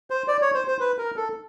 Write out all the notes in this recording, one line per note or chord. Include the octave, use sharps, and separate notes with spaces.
C5
D5
C#5
C5
C5
B4
A#4
A4